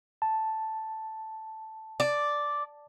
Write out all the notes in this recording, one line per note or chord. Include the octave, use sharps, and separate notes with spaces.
A5
D5